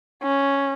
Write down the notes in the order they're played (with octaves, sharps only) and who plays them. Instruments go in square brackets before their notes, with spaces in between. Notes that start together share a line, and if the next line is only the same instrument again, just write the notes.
[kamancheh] C#4